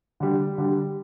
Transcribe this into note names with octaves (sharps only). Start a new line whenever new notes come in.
D3 G3
D3 G3